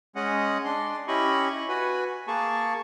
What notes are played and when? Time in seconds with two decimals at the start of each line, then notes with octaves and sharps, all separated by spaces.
0.16 G#3 C#4 D#5 F#5
0.65 D4 C6
1.08 C#4 E4 G4 D#5 B5 C#6
1.50 C#6
1.68 F#4 B4 G#5
2.28 A#3 G#4 A5 C#6